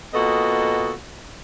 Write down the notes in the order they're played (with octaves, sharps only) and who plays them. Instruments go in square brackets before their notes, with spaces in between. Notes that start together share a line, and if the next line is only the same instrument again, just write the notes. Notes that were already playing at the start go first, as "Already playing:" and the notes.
[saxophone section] A#2 B3 F#4 A4 D#5